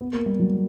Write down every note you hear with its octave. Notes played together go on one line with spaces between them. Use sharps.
B3
A#3
G3
F#3